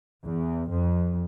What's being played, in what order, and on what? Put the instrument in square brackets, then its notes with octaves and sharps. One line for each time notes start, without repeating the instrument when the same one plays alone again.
[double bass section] E2
F2